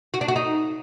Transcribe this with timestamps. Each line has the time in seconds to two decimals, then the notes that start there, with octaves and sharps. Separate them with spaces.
0.14 F#4
0.21 D4
0.28 F#4
0.36 D#4